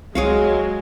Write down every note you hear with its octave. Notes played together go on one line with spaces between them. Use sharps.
C2 F#3 G#3 G#4 C#5 F5